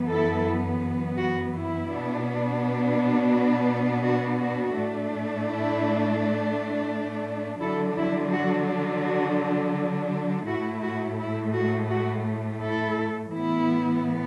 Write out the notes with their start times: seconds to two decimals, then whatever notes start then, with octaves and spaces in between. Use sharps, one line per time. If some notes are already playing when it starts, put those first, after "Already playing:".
Already playing: F#2 E3 B3
0.10 E4 A4
1.17 F#4
1.53 E4
1.88 B2 B3 D4
3.31 F#4
4.03 F#4
4.39 F#4
4.75 A2 A3 D4
5.46 E4
7.61 D3 F#3 D4 E4 A4
7.97 E4
8.33 F#4
9.04 F#4
10.47 A2 A3 E4 F#4
10.83 F#4
11.19 E4
11.55 F#4
11.90 F#4
12.61 E4 A4
13.33 A2 E3 B3 E4